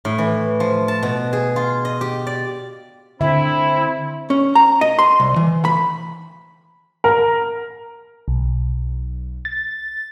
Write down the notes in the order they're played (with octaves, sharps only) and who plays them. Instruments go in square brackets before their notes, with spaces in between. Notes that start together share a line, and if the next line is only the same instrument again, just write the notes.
[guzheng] A2
E3
F3
A5
B2
G#4
F4
D#5
G4
D5
[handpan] D3 E5 [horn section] C4 E4
[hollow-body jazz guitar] C#4
A#5
D#5
C6
C2
E3
B5
[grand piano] A#4
[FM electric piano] B1
A6